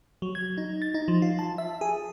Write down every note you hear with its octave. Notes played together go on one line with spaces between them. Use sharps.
F#3
G#6
D#4
A6
D#4
F3
F4
A5
E5
G#4